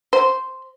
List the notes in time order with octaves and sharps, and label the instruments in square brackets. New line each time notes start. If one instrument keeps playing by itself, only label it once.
[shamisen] C5